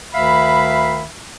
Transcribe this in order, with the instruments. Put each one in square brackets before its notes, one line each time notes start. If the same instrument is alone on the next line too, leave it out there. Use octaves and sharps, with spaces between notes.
[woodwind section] D2 D#3 E5 F5 B5